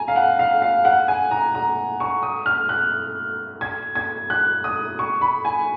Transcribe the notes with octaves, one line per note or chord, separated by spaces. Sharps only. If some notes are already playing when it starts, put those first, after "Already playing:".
Already playing: G#5 A#5
F5
F#5
F5
F5
F#5
G#5
A#5
A#5
C#6
D#6
F6
F#6
G#6
G#6
F#6
D#6
C#6
B5
G#5